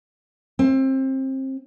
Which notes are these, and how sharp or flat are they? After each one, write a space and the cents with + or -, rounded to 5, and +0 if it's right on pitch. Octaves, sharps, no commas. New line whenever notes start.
C4 +25